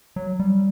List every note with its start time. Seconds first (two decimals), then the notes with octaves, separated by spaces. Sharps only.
0.16 F#3
0.39 G3